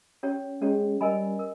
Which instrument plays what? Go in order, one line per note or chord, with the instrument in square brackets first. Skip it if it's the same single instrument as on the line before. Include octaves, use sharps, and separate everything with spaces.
[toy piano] C#4 G4 C#5
[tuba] G#3 [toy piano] C#4 G4 C#5
[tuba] G3 [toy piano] A#4 D#5 G#5 B5
[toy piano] A#4